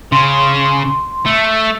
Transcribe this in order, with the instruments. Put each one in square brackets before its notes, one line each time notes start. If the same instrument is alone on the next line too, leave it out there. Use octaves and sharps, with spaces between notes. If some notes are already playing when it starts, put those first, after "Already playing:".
[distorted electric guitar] C#3 [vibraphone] C6
[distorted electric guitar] A3